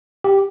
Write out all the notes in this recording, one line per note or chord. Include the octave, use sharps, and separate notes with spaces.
G4